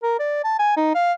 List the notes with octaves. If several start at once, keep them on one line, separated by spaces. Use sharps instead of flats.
A#4
D5
A5
G#5
D#4
F5